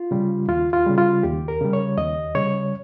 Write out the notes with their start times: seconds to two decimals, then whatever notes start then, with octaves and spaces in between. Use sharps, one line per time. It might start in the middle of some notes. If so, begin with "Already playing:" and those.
Already playing: F4
0.11 C#3 G3
0.48 D#2 F4
0.73 F4
0.86 C#3 G3
0.98 F4
1.23 D#2 G4
1.48 A#4
1.61 C#3 G3
1.73 C#5
1.98 D#2 D#5
2.35 C#3 G3 C#5